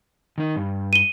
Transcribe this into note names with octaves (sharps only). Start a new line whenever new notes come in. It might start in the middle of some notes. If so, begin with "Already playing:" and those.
D#3 D#4
G2
D#7 G7